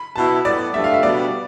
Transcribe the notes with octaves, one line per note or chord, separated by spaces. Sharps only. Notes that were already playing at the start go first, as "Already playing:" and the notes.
Already playing: B5
B2 B3 E4 A5
A2 G3 B3 D5
G2 F3 A3 E5
F5
E5
B2 G3 B3 D4 D5